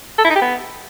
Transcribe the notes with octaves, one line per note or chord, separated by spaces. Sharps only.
A4
E4
D#4
G4
B3